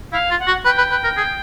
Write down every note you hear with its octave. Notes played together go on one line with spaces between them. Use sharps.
E4 F5
F4
F#5
F#4
B4 G5
B4
B4
A#4
G#4